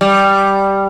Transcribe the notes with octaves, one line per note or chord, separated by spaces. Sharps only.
G3